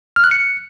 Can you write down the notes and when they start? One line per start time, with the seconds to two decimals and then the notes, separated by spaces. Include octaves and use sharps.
0.16 F6
0.24 F#6
0.31 C#7